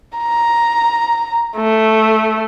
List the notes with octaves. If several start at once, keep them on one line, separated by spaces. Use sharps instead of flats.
A#5
A3